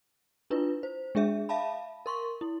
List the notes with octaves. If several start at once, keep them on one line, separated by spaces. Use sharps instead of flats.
D4 E4 F4 B4
C5
G#3 D4 G#4 E5
E5 F5 A5 B5
A#4 C6 C#6
E4